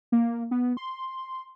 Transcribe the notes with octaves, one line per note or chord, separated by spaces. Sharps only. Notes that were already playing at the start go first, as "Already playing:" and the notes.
A#3
B3
C6